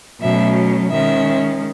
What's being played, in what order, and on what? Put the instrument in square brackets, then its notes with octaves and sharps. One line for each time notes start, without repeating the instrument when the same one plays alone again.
[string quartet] B2 F#3 A3 C#4 E5
D#3 G#3 C#4 E5